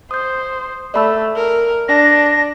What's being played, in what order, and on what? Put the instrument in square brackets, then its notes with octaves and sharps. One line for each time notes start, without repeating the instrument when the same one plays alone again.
[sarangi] C5 [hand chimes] D#6 G6
[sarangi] A3 [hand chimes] D5 B5 E6
[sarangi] A#4
[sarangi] D4 [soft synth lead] A#6